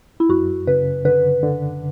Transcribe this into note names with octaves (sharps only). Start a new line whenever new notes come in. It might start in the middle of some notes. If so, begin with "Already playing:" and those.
E4
F#2 F#4
C#3 B4
D3 B4
D3